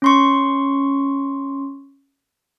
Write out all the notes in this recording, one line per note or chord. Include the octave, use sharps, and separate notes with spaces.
C#4 C6 C#6